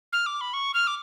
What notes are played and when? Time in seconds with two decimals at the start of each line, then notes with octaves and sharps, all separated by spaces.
0.13 F6
0.26 D6
0.41 B5
0.54 C#6
0.74 F6
0.87 D6